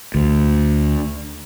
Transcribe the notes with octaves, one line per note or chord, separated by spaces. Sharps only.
D2